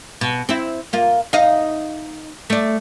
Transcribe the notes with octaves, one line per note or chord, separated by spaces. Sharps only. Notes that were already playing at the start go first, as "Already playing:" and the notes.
B2
C4 E4
A#3 F4
D#4 D#5 F5
A3 D5